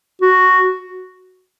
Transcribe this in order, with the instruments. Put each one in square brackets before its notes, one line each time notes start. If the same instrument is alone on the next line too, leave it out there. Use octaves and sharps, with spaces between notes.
[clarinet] F#4